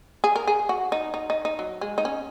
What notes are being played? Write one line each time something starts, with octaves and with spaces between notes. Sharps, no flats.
G#4
A#4
G#4
F#4
D#4
D#4
D#4
D#4
F#3
G#3
D#4
C#4